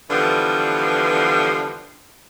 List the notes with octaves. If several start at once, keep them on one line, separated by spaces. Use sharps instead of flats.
D3 E3 F3 G3 B3